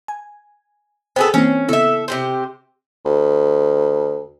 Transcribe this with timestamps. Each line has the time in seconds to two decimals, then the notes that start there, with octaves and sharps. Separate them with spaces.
0.08 G#5
1.16 B3 G#4 A4 C5 G5
1.34 E3 A#3 C4 C#4
1.69 C#3 B3 E4 A4 E5
2.08 C3 G4 C5
3.05 D2